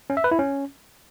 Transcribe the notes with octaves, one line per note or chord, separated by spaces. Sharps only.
C#4
E5
B4
E4
C#4